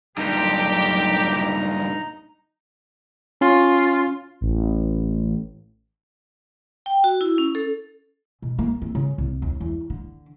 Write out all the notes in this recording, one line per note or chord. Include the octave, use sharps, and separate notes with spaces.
C2 G2 A#2 D3 F#3 D#4 G4 A#5
C#4 F4
A1
G5
F#4
E4
C#4
A4
B2
A#3
C4
C#3
C2
D#2
E2
D3